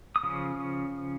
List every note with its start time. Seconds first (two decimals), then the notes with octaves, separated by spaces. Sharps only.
0.16 D#6
0.23 C#3 F3 C#4